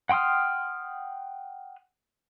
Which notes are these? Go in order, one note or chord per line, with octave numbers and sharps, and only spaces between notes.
F#5 G5 C6 D#6 F6